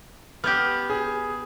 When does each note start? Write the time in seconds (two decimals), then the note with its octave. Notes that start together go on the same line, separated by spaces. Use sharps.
0.44 B3 G4 F6 G6
0.90 G#4